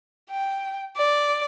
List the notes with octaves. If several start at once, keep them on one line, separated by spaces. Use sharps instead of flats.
G5
D5